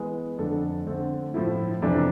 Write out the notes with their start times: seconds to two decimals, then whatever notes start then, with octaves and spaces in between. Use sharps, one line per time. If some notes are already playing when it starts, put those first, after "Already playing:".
Already playing: E3 G#3 B3
0.38 F2 D3 A3 D4 A4
0.87 D3 A3 C4
1.34 A2 F3 A3 E4
1.82 F2 C3 E3 A3 D4